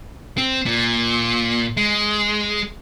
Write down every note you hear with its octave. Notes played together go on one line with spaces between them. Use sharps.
C4
A#2
G#3